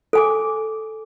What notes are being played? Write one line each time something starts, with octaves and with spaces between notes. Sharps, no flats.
A4 G#5 D6